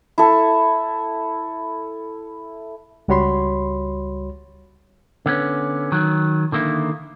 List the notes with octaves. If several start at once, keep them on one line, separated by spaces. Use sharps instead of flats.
E4 A4
C#2 G3 F#4 C#5 B5 C6
D3 B3 C#4
D#3 F#3
D3 D#3 A#3 E4